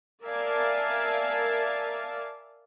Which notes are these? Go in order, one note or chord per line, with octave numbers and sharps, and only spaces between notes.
A#4 D5 E5 F5 G#5 A5